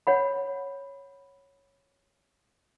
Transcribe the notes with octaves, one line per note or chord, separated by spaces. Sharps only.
C#5 F#5 B5